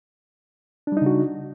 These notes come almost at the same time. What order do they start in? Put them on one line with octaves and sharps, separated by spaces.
D4 G3 D#4 C#3 F#4